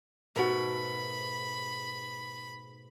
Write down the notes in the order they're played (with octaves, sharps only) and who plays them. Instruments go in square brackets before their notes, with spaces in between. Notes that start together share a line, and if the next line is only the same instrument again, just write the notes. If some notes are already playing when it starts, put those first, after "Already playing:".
[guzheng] G#2 B2 A3 [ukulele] F#4 A#4 [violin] B5